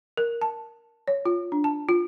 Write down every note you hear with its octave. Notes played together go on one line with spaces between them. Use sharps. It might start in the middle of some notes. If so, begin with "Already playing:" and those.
A#4
A5
C#5
F4
D4
A5
F4